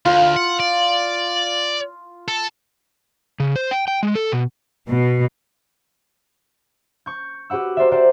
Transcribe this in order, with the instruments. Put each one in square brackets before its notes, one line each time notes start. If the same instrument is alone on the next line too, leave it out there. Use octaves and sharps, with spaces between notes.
[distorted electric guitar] D2 [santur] F4
[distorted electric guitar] F#5
D5
A4
[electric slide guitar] C#3
C5
G5
G5
G#3
A4
B2
[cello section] B2
[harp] C#6 G6
F#4 G4 B4 F#5 E6
A#4 C5 D5 E5
A#4 C5 D5 F#5 G5